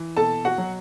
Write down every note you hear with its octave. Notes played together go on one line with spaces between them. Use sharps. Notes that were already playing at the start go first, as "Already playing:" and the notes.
Already playing: E3
B2 A4 A5
F#4 F#5
F#3